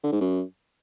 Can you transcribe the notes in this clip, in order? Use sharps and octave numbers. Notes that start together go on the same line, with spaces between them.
D3
G#2
F#2